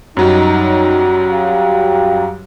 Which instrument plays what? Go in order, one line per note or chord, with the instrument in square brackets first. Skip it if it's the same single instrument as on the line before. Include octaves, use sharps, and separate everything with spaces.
[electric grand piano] F#2 F#3 G3 [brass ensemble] D#4
[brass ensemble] G4 F5